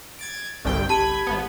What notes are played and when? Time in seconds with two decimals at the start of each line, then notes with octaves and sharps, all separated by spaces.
0.19 G#6 A6 D7
0.65 G1 C2 G5
0.89 G4 A5 B5 G#6 D#7
1.27 G#1 B3